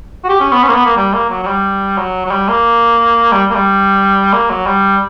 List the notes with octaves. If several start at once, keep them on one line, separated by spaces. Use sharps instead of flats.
F#4
G4
C#4
B3
C#4
A#3
B3
A#3
G3
A#3
F#3
F#3
G3
F#3
F#3
G3
A#3
G3
A#3
G3
A#3
F#3
G3